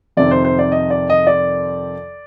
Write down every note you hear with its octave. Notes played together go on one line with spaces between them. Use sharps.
F2 C3 D#3 D5
C5
C5
D5
D#5
D5
D#5
D5